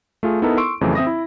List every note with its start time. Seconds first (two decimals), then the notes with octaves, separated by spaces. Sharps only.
0.23 A3 F4 G#4
0.42 B3 D#4 E4 A4 A#4
0.57 C6 C#6 E6 D7
0.81 F2 C#3 E3 F#3 A3
0.95 C4 E5 D#6 A#6
1.07 E4